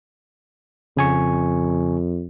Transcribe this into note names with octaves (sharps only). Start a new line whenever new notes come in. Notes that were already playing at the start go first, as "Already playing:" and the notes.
F2 C#3 G#5 C#6